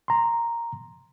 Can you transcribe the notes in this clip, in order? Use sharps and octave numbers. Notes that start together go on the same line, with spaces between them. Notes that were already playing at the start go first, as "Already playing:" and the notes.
A#5 C6